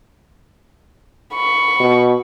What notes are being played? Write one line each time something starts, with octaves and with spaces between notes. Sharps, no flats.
B5 C#6
B2